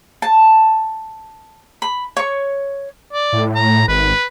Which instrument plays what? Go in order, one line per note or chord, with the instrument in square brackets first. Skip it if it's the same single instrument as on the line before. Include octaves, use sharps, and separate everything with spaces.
[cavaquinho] A5
B5
C#5 C#6
[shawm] D5
[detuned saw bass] A2
[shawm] A#5
[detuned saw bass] G#1 [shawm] B4